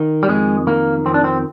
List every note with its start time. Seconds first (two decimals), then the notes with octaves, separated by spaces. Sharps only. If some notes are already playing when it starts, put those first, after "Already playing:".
Already playing: D#3
0.23 G3
0.28 F2 G#3
0.67 D#3 A#3
1.05 F2 C4
1.14 D4
1.24 C4